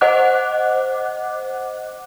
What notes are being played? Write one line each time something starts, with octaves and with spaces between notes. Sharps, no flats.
C5 D#5 F#5 D6 F#6